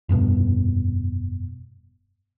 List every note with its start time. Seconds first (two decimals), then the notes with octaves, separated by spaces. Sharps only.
0.09 F1 G2 B2